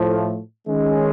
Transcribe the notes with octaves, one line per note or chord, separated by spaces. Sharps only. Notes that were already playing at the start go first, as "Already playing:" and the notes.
Already playing: A2 F3 A3
D#3 G#3 C#4